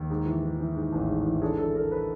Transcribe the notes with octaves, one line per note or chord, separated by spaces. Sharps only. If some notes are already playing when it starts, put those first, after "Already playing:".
Already playing: D#2
G#2
E3
E3
E3
G#2
A1
G#2
E3
D3 G#4
D3 A4
D3 A#4
B4